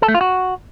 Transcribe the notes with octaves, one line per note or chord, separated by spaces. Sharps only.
A4
A3
F4
F#4